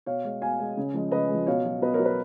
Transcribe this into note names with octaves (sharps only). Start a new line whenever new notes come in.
B2 C#5 F5
G#3
B2 F5 G#5
G#3
C#3
F3 G#3
C#3 B4 D#5
F3 G#3
B2 C#5 F5
F#3
B2 B4 D#5
A#4 C#5
F#3
B4